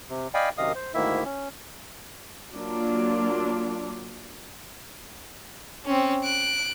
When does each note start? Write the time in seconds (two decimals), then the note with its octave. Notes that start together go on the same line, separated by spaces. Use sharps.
0.10 C3
0.34 D5 D#5 F5 G5 G#5 B5
0.58 F#2 C3 D#3 D#5 F5 D#6
0.75 C5
0.94 D2 G#2 D#3 A#3 E4 E5
1.25 C#4
2.55 F#3 A#3 D4 F4
5.85 C4 C#4
6.24 F#6 D7